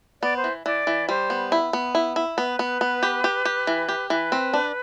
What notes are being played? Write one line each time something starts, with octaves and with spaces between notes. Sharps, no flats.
B3 D5
C5
E3
E3 D5
E3
G3 C5
B3
E4
B3
E4
E4
B3 B4
B3
B3
G4
G4
G4
E3
G4
E3 B4
C4
D4